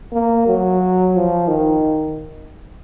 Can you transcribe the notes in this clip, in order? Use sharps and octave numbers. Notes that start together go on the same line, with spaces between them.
A#3
F#3
F3
D#3